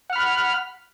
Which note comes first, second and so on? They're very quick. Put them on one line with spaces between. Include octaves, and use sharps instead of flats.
F#5 F6 B5